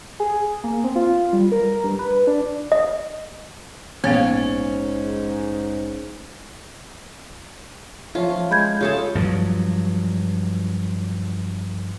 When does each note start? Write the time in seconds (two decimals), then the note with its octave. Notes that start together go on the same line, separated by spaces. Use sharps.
0.20 G#4
0.64 A#3
0.84 C4
0.96 F4
1.33 G3
1.52 A#4
1.84 G2
1.99 B4
2.27 D4
2.72 D#5
4.04 A#1 G#2 A#3 B3 C#4 F5
8.15 F3 A3 C#4 F4
8.51 G#3 B5 G6 G#6
8.81 C#3 A3 F4 G#4 A4 A5
9.15 G2 F3 F#3